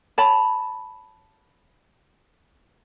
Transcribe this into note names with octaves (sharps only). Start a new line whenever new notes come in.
C#5 A5 B5